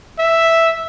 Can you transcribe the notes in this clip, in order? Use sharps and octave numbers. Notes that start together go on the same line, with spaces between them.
E5